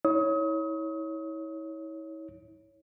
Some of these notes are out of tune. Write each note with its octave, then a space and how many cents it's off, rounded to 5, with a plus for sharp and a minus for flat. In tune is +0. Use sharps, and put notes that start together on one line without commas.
E4 -40 C#5 +0 D#6 +35